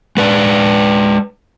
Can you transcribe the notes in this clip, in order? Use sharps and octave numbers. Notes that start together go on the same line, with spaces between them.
G#3 B4 D5